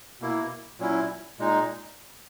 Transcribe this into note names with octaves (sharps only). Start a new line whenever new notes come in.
B2 A#3 E4
A#2 F#3 C#4 E4
A#2 G#3 D#4